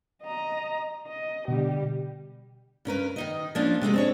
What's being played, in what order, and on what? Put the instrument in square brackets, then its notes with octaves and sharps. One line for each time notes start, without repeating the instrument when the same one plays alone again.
[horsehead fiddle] D#5 A#5
D#5
[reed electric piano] B2 D3 [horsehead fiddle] G3 G4
[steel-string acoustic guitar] G2 C#4 A#4 B4
D#3 D#4 D#5
F3 A#3 C#4 D4 F4
C3 G#3 A3 G#4
C4 D4 C#5